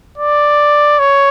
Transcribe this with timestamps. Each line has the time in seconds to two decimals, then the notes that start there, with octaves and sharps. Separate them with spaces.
0.18 D5
0.99 C#5